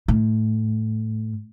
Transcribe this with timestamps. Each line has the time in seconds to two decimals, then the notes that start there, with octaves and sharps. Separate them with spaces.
0.08 A2